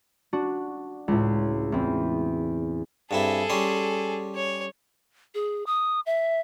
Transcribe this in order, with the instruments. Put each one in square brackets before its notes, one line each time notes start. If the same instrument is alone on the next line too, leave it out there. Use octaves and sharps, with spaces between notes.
[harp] D4 F#4
C#2 A2
E2 C4
[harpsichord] G2 C4 E4 [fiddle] G#4 A4
[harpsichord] G3 C#4 C6
[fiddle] C#5
[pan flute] G#4
D#6
E5